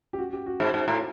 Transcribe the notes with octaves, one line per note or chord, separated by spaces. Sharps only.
G4
F#4
G4
F#4
G#2
G#2
A2